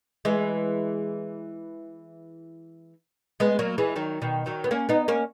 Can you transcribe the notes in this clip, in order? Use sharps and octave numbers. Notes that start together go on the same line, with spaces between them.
E3 G#3
G#3 B3
F#3 A#3
E3 G#3
D#3 F#3
B2 D#3
D#3 F#3
B3
A#3 C#4
B3 D#4
A#3 C#4